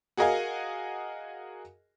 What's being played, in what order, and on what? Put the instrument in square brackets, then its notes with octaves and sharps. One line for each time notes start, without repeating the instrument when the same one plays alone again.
[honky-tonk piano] F#4 G#4 A#4 D#5 F5 G#5